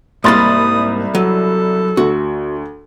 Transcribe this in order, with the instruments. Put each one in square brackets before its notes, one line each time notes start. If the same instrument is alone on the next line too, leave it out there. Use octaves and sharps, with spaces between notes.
[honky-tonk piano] C2 B5 A6 [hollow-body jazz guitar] G#2 A#3 C6 [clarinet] D#6
[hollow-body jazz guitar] F#3 [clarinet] A4
[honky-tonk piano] D2 [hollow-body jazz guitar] F#4